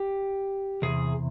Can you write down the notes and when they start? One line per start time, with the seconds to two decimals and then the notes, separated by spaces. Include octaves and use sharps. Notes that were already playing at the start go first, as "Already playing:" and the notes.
Already playing: G4
0.82 E2 C3 G#4